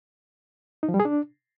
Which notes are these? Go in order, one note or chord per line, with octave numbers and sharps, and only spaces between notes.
D#4
F3
G3
G#4
D4